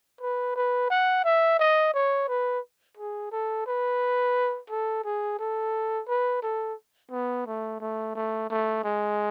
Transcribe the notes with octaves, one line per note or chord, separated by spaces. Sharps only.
B4
B4
F#5
E5
D#5
C#5
B4
G#4
A4
B4
A4
G#4
A4
B4
A4
B3
A3
A3
A3
A3
G#3